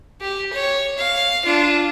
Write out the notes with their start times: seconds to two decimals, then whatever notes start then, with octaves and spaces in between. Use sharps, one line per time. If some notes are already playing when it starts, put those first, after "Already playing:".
0.21 G4
0.53 C#5
0.98 F5
1.45 D4 F4